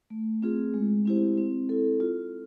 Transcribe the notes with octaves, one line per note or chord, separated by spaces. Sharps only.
A3
C4 F4 G#4
G#3
C4 E4 G4 C5
C4
E4 A4
F4